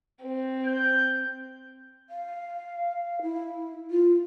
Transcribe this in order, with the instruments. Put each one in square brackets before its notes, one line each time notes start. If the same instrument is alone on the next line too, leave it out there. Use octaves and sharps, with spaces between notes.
[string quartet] C4
[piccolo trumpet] G6
[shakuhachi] F5
E4
F4